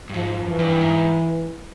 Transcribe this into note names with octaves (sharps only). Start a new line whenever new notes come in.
G2
G#2 F3
F#2
E3
G2
G#2